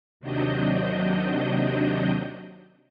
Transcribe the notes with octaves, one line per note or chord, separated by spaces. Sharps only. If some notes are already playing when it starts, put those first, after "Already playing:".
D#2 C3 F#3 D4 D#5 G6